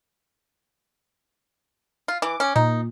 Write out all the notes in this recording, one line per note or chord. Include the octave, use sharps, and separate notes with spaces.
F4
E3 D6
C#4
A#2 D#4